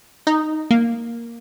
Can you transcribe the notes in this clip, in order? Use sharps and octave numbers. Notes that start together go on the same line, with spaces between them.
D#4
A#3